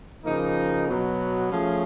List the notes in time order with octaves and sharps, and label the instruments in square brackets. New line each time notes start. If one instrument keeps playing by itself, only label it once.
[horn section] C#3 F3 A#3 D#4
B2 F#3 B3
F3 A3 C#4 F4 G#4